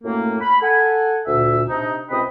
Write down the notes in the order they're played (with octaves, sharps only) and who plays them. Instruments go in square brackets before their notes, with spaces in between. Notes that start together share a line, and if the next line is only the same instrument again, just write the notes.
[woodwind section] F#2 A2 A3 A#3
B5
A4 F#5 G#5
D2 A#2 E5
C3 D4 D#4
C#2 C3 D#5 G5 B5 D#6